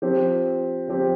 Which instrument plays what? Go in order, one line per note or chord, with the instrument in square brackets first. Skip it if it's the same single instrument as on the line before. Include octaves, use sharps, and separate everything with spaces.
[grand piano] F3 C4 G4
F3 C4 G4